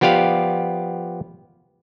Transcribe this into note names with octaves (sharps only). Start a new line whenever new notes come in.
F3 B3 G4 D5 F5